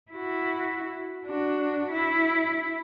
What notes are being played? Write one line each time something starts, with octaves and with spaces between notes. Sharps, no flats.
E4 F#4
D4 F#4
E4